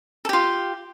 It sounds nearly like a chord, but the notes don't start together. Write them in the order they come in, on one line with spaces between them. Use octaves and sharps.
A4 G4 F4